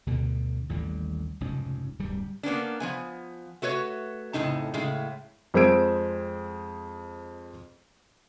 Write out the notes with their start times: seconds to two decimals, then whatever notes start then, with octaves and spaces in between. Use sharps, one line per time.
0.07 D2 G2 B2 D3
0.69 A1 D#2 D3 G3
1.41 F1 C#2 G#2 C#4
1.99 D1 G2 G3
2.43 A#3 B3 C#4 D4
2.80 F3 B3 G#5
3.62 A3 F#4 B4 C#5
4.33 F2 A2 C#3 D#4 A5
4.74 A2 C#3 G#3 A3
5.54 F2 G#3 C5 E6 G#6 D7